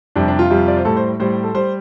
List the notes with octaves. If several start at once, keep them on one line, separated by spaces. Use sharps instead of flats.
F2 C3 G3 D4
D4
F4
F2 C3 G3
D5
C5
A2 G3 A4
C5
A2 G3 C5
A4
G3 C5